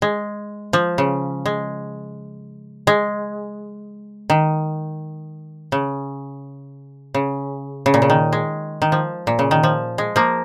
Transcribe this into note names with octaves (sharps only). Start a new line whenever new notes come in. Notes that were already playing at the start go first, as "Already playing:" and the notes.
G#3
F3
C#3
G#3
G#3
D#3
C#3
C#3
C#3
A#2
C#3
D#3
G#3
D#3
F3
A#2
C#3
D#3
F3
G#3
F3 A#3